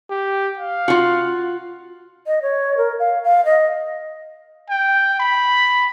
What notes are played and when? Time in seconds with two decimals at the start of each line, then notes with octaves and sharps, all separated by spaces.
0.11 G4
0.57 F5
0.88 F4 F#4
2.27 D#5
2.42 C#5
2.77 A#4
3.00 F5
3.24 F5
3.45 D#5
4.70 G5
5.20 B5